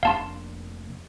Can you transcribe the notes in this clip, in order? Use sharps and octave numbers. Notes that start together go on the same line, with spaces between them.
F1 A#3 D4 F5 A5 C6